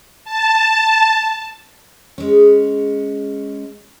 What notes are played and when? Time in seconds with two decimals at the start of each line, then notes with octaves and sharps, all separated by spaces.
0.25 A5
2.18 G#3 C#4